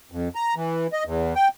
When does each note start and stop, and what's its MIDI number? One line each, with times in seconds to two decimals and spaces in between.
0.12 0.29 41
0.35 0.54 82
0.56 0.87 52
0.93 1.04 75
1.05 1.34 40
1.35 1.48 79